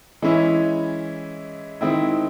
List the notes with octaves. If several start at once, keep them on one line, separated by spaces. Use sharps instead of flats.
E3 G#3 C#4 E4
D#3 G#3 C4 E4